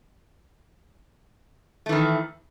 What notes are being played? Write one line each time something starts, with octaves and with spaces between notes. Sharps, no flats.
D#3 E3 A3